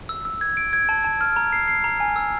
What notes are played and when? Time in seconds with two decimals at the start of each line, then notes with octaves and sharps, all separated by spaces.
0.09 E6
0.25 E6
0.41 G#6
0.57 D7
0.73 G#6
0.89 A5
1.04 A5
1.21 F6
1.36 A#5
1.53 C7
1.68 C7
1.84 A#5
2.00 G#5
2.16 E6